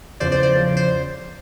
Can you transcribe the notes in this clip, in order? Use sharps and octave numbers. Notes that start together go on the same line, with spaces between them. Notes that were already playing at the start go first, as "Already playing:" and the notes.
E2 C#3 F3 C5 D5
C5 D5
C5 D5
E2 C#3 F3
C5